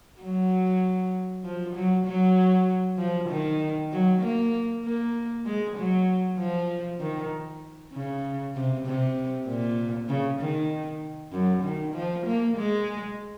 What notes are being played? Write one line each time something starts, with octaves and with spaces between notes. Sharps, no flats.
F#3
F3
F#3
F#3
F3
D#3
F#3
A#3
A#3
G#3
F#3
F3
D#3
C#3
C3
C3
A#2
C#3
D#3
F#2
D#3
F3
A#3
G#3